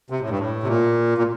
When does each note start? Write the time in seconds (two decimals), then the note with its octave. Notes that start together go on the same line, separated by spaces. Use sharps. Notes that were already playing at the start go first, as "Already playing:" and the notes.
0.10 C3
0.20 A2
0.30 G2
0.39 A2
0.63 C3
0.68 A#2
1.18 A#2